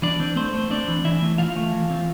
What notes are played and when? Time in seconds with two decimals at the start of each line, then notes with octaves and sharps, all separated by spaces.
0.02 E3 D4 D5
0.20 C4
0.36 A3 C4 C5
0.54 A3
0.70 C4 D4 D5
0.88 E3
1.05 E3 E4 E5
1.21 A3
1.38 E3 F4 F5
1.56 A3
1.73 E3
1.90 C4